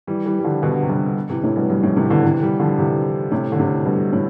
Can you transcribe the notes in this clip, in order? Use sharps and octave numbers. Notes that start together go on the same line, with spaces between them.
E3 G3
E3 G3
G3
D3 F3
B2 D3
C3
G2 B2
C3 E3
A2 C3
G2 B2
E2 G2
F2 A2
A2 C3
E3
B2 D3
C3 E3
E3 G3
D3 F3
C3 E3
A2 C3
D3
A2 C3
G2 B2
A2